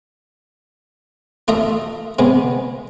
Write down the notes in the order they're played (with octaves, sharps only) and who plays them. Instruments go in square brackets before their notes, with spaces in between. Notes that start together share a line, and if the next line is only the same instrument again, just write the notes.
[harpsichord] A3 F4 A4 D#5 E5
C3 G#3 B3